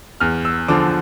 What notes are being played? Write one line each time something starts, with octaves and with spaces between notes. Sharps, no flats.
E2 F6
E6
D3 F3 D6